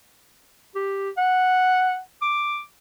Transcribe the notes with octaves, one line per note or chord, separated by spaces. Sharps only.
G4
F#5
D6